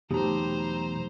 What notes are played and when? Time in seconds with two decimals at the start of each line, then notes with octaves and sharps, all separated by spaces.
0.11 E2 B2 F#3 A3 D#4 G4 C5 A#5